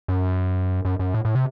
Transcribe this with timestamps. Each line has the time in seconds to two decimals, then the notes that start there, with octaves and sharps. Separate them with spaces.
0.08 F#2
0.85 F#2
0.99 F#2
1.14 A2
1.25 A2
1.35 C3